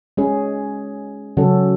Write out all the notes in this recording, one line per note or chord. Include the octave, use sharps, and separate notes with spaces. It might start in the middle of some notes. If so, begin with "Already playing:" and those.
G#3 C#4 G#4
C#3 F#3 C#4 F#4 A4